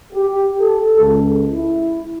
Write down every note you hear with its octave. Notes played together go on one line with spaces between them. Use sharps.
G4
A4
C#2
E4